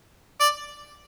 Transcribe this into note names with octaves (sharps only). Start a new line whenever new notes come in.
D5